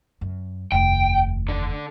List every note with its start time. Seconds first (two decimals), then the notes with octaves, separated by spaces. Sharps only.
0.21 F#2
0.72 F1 D#2 G5
1.48 D3